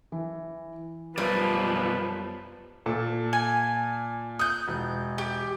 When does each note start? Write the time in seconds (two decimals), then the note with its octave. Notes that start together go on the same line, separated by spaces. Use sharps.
0.12 E3
1.18 F#2 B2 F3 G3 F4 B4 D5
2.86 A#2 A4 A5
3.33 G#5
4.39 D#6 F#6 G6
4.68 E1
5.18 G4